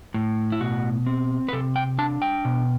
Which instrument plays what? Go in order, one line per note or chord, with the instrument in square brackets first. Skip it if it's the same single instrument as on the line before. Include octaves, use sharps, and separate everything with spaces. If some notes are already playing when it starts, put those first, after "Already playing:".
[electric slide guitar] A2
E4
B2 F#4
C4
B4
C3 A4
G5
D4 A5
G5
B2